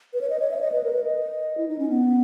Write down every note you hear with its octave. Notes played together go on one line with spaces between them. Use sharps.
B4
C#5
D#5
C#5
E5
C#5
D#5
B4
A#4
B4
D#5
E4
D#4
C#4
B3